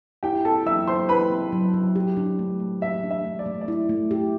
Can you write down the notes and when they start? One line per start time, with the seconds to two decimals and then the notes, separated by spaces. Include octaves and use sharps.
0.23 E4 G4 G5
0.45 C4 A4 A5
0.66 F#3 E5 E6
0.88 F#3 C5 C6
1.09 E4 B4 B5
1.30 C4
1.52 F#3
1.74 F#3
1.96 G4
2.17 D4
2.39 A3
2.60 A3
2.81 G4 E5
3.03 D4
3.11 E5
3.25 A3
3.39 D5
3.46 A3
3.61 D5
3.68 E4
3.89 A3
4.11 G4